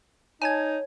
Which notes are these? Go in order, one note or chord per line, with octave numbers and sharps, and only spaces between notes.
D#4 C#5 G#5 A5 G#6